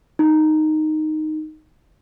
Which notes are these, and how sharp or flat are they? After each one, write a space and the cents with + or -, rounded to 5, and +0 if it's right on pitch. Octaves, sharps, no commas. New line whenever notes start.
D#4 -5